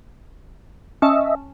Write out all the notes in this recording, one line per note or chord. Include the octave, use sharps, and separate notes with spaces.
C#4 D#5 E5 A5